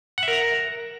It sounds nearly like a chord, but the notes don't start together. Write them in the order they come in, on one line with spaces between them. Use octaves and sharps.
F#5 E5 A#4 A#5